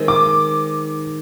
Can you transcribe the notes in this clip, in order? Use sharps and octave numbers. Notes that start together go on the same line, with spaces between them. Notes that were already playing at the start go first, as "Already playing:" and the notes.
Already playing: D#3 G#3 C4
D6